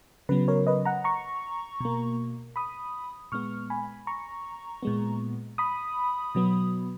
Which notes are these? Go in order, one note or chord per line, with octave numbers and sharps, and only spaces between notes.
C#3 F#3 B3 B4
A#4 C#5
B4 D#5
F#5 A#5
A#5 C#6
B2 A#3
B5 D#6
A#2 G#3 B3 C#6 F6
G#5 B5
A#5 C#6
A#2 G#3 B3
B5 D#6
B2 F#3 B3